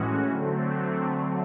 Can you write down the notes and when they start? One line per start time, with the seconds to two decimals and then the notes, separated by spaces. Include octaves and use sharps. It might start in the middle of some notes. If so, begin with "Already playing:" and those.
Already playing: A2 E3 G#3 C#4 F#4
0.29 D3 F#3 A3 C4